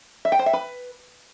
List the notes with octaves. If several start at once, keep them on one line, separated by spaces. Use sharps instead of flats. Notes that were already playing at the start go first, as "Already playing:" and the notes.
E5
G5
C5
E5
B4